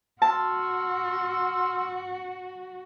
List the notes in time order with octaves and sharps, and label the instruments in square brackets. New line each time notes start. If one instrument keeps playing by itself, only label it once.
[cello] F#4 [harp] A5 [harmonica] C6 E6 F6